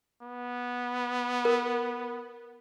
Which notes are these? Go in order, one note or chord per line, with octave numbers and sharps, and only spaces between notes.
B3
A#4